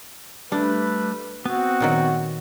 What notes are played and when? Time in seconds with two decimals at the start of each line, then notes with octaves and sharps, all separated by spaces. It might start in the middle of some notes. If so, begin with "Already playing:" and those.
0.52 G3 A3 D4 B4
1.46 B3 C4 F#4
1.80 A#2 D#3 F#3